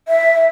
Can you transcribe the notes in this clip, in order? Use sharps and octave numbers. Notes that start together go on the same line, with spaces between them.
E5